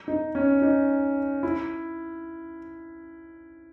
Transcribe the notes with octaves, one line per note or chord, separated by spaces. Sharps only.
D#4
C#4
D#4
E4